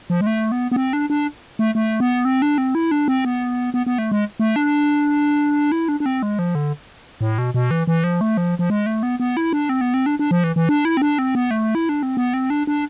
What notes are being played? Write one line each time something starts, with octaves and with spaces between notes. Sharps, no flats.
F3
G#3
A3
B3
B3
C4
D4
D4
A3
A3
B3
C4
D4
C4
E4
D4
C4
B3
B3
B3
A3
G#3
A3
D4
E4
D4
D4
C4
G#3
F3
D3
A2
B2
B2
E3
E3
F3
A3
F3
F3
G#3
A3
B3
B3
E4
D4
C4
B3
C4
D4
D4
F3
E3
E3
D4
E4
C4
D4
C4
B3
A3
E4
D4
C4
B3
C4
D4
D4